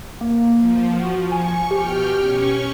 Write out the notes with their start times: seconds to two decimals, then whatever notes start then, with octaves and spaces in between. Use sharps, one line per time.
0.21 A#3
0.55 F3
0.99 F#4
1.32 G#5 C#6
1.71 B2 G4 G5 F6
2.19 C#4 C#6